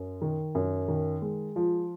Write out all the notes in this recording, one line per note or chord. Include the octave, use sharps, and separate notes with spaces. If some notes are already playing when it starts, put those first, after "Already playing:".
Already playing: F#2
D#3
F#2
D#3
G#3
F3